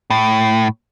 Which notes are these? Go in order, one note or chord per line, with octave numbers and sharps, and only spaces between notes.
A2